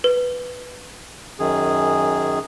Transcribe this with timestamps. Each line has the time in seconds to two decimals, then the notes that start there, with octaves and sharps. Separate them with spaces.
0.04 B4
1.39 F#2 D#3 G#4